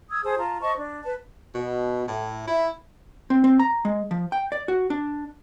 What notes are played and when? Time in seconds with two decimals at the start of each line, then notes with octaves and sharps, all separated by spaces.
0.10 D#6 E6 G#6
0.23 G#4 C5 A5 D#6
0.38 F4 A5 A#5
0.61 C5 D#5 A5 C#6
0.75 D4
1.03 B4 A5
1.53 B2
2.07 A2
2.47 E4
3.30 C4
3.44 C4
3.59 A#5
3.85 G#3
4.11 F3
4.32 G5
4.52 D5
4.68 F#4
4.90 D4